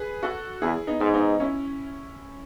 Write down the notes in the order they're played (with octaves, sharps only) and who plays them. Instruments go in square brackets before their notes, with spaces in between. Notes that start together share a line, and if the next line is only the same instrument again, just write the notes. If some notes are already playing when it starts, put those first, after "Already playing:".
Already playing: [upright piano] G#4 B4
F#4 A4
[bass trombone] E2 [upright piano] E4 G#4
[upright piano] B3 D#4
[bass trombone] G#2
[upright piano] B3 D#4
C#4 E4